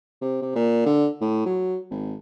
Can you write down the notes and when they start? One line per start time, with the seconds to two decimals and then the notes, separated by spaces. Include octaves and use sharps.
0.21 C3
0.42 C3
0.56 A#2
0.86 D3
1.21 A2
1.46 F#3
1.90 G#1